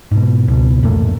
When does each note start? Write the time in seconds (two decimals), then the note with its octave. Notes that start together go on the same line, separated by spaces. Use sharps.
0.11 G#2 B2
0.48 C#2 B2
0.83 A1 F2 A#2 A3